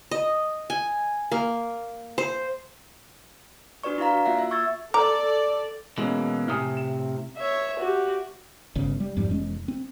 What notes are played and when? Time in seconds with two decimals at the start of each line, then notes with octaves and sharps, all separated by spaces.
0.11 D#5
0.70 G#5
1.32 A#3
2.18 C5
3.83 D4 F#4 B4 D5 C#6
3.98 E4 F#4 D5 F5 A#5
4.12 F#4
4.25 A#3 F4 E5 F#5
4.39 E5
4.51 C#6 E6 G#6 A6
4.94 A4 D5 A#5 D6
5.98 B2 E3 G#3 A#3 C#4
6.48 A2 C3 G#5 D#6 F6
6.77 E7
7.37 C#5 E5
7.79 F#4 G4
8.75 G1 C#3
9.00 G3
9.17 F2 G#2 F3 G3
9.29 F1 E2 G#3 C#4
9.68 C4